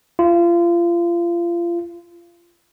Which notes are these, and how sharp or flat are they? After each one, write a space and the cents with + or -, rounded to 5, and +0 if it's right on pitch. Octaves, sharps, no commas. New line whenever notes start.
F4 -30